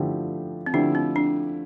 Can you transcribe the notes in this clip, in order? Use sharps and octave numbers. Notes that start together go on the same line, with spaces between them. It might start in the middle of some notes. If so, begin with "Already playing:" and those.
Already playing: D3 F3 A3 E4 G4
C4
D3 F3 A3 D4 E4 G4
C4
D4